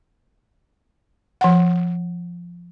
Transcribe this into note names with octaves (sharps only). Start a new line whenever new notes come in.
F3 F#5